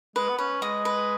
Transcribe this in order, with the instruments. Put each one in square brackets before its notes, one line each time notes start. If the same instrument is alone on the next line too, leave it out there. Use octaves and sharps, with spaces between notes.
[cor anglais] G#3 [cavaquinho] B4
[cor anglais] B3
[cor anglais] C#4 [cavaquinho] B4
[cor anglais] G#3 [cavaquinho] D#5
[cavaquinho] B4